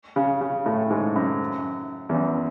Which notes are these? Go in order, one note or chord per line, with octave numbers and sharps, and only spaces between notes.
C#3
C#3
A2
G#2
F#2
E2
F#2